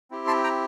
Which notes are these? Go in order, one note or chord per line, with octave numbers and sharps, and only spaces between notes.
C4 E4 G4
A5 C6
G5 A#5